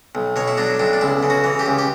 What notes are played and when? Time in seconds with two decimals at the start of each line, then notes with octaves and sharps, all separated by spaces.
0.15 B1
0.36 B2 C#5
0.48 E4
0.57 F#3 D4
0.79 B1 D4
0.93 D4
1.01 C#2 E4
1.23 C#3
1.30 F#4
1.44 E3
1.59 G4
1.66 C#2
1.79 G4